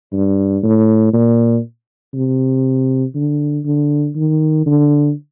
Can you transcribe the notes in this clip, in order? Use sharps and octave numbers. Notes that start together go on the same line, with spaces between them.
G2
A2
A#2
C3
D3
D3
D#3
D3